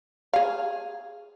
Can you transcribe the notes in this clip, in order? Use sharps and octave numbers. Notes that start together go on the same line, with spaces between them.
G#4 F5